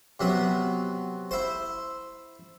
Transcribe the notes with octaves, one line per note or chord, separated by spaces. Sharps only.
C3 F#3 B3
E4 C5